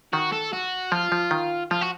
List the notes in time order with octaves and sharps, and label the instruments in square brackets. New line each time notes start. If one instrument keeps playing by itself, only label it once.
[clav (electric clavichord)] D#3 [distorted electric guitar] F#4
[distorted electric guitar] A4
F#4
[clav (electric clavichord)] F3 [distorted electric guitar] F4
[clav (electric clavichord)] F3
D#3
[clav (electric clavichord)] F3 [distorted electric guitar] F4
[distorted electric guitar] F#4